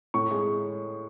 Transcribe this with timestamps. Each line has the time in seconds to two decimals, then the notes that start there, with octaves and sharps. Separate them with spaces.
0.14 A2 C#6
0.31 G#3